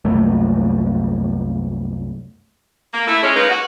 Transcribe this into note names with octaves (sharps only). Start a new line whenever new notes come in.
C2 F#2 A3 A#3
A#3
A3 E4
G#3 C#4
G#3 A#3 C#4 D#4 B4
F#4